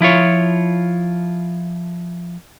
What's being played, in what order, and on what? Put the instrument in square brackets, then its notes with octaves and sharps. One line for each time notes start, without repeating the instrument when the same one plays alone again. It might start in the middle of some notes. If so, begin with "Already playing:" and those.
[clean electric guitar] F3 E4 F4 C#5